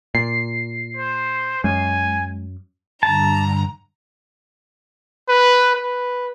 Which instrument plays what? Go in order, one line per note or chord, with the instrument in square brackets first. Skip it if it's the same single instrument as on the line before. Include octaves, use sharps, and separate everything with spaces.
[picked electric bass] A#2 [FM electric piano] C7
[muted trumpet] C5
[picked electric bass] F#2 [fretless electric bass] G#3 [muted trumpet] G#5
[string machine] G2 D3 [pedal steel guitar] A5 [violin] A#5
[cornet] B4
B4